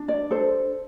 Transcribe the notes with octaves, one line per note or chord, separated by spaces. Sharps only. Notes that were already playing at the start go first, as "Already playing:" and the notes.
Already playing: D4
D5
A4 C5